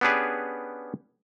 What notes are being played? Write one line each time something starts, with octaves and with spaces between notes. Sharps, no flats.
B3 C#4 D4 G4 G#4 B4